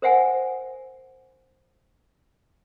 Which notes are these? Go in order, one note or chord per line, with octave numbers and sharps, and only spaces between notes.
A#4 C5 E5 F#5 G#5